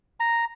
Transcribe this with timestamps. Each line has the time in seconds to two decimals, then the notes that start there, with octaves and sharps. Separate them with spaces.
0.20 A#5